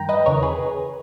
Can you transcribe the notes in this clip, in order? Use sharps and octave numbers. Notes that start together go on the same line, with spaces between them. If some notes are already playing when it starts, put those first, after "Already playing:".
Already playing: G2 D#3 G5 A#5
B4 D#5
E2 C#3 E3 A#4 C#5
G#4 B4